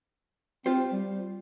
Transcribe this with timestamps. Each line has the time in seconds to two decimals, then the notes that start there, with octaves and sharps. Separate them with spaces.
0.66 C4 F4 G4 C5
0.92 G3